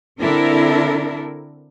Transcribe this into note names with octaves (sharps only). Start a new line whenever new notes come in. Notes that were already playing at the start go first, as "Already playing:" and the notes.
D3 C4 D4 E4 A4 A#4